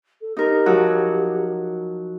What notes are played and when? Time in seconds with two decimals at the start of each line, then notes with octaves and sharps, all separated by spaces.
0.21 A4
0.37 D#4 G4 A#4
0.66 F3 F#3 F#4